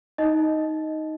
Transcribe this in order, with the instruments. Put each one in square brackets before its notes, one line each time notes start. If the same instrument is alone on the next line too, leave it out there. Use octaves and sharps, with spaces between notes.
[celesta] D#4 D#5